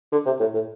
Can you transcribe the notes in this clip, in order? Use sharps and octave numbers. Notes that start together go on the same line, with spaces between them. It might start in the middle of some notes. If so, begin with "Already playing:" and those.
D3
C3
A2
A2